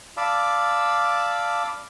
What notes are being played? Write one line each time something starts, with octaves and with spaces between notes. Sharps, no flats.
D5 F5 A5 B5 D6 E6